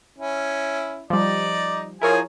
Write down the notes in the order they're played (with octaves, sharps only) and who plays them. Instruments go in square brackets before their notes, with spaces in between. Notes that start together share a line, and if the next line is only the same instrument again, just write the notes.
[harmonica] C#4 E4
[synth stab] F3 G3 [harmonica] D#4 D5
[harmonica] F3 G#4 G#5 [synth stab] E4 A#4 C#5